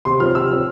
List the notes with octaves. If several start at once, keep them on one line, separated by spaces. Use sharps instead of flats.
C3 C6
F3 C4 F6
C3 E6
F3 C4